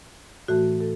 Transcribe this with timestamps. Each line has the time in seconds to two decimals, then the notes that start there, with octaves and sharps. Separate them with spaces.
0.48 A2 E3 A3 F#4
0.81 A4